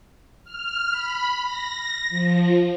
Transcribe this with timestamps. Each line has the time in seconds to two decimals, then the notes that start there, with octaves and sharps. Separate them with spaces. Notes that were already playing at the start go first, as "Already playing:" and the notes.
0.44 F6
0.90 B5
1.43 A#6
2.10 F3